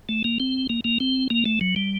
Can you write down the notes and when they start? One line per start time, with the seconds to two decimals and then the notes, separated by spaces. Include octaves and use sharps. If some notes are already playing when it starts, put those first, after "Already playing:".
0.09 A3
0.24 A#3
0.40 C4
0.70 A#3
0.84 A#3
1.00 C4
1.30 A#3
1.46 A3
1.61 F#3
1.76 G3